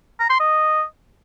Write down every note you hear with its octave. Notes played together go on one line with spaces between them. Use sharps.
A#5
C6
D#5